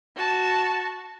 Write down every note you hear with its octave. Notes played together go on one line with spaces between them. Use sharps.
F#4 A5